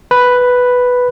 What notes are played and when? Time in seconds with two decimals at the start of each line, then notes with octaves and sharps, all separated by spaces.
0.11 B4